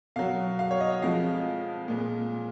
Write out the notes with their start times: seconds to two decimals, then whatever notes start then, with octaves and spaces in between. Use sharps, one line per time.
0.16 B2 F#3 F5
0.59 F5
0.71 C#5
0.80 D#5
1.02 F2 F3 G#3 F5
1.88 A#2 G#3